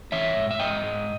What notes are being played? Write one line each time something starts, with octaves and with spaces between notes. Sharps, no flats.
E3 C#5 E5
G#2
E5
G#2 D#5 G5
G#3